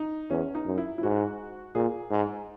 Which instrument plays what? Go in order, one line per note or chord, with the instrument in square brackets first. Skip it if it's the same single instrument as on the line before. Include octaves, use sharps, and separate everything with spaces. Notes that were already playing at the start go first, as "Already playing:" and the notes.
Already playing: [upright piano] D#4
[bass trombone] E2 [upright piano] C#4
[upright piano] D#4
[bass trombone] F#2
[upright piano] E4
E4
[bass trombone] G#2 [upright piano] F#4
[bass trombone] A#2 [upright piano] G#4
[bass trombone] G#2